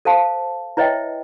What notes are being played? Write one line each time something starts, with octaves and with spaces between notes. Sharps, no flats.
A4 C5 F5 A5
E4 B4 C#5 D#5 E5 G5